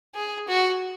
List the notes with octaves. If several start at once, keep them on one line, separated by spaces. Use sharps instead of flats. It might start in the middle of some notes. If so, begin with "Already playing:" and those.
G#4
F#4